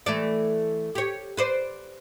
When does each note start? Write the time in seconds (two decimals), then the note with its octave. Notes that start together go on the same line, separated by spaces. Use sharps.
0.06 E3 A3 D5
0.95 G4 C#5
1.37 B4 C5 D5